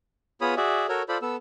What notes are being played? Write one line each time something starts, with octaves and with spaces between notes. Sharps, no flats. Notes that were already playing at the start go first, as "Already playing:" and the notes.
B3 F4 G#4 C#5 B5 D#6
F#4 G#4 D5 E5
F#4 A4 A#4 C#5
F4 A4 C5 D5 B5
B3 A4 E6